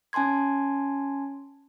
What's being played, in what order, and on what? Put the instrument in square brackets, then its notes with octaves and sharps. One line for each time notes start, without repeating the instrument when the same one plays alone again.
[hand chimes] C#4 G#5 A5 C6 G#6